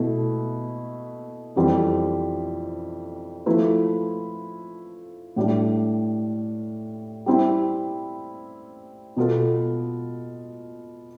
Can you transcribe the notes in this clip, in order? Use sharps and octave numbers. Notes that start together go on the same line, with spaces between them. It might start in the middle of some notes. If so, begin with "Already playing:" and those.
Already playing: B2 A3 E4
F2 E3 G3 C4 G4
F3 A3 E4 B4
A2 G3 D4 G4
G3 C4 E4
B2 B3 F4 A4